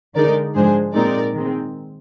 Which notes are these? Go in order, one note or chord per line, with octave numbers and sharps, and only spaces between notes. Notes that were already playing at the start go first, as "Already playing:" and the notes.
D3 G#3 D#4 A#4 D5
G#2 F3 G#3 D4 G#4 C5
A#2 G#3 C4 D#4 A#4 D5
D#3 G#3 C4